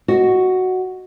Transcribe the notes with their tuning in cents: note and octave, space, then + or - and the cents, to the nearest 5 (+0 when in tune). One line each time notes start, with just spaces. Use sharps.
F#4 +0 D#5 +0